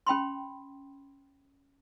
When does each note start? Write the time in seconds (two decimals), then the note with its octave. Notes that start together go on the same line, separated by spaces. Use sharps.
0.07 C#4 G5 B5 C6